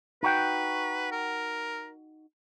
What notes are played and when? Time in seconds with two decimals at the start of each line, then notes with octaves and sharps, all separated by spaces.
0.23 D#4 F#4 B4 G5
1.11 A#4